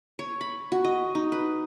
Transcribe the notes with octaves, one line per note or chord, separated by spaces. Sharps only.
C#5
B5
F#4
D#5
D#4
B4